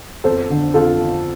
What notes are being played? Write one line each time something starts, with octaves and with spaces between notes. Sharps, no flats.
F2 A4 C5
D3
F2 F4 A4
F3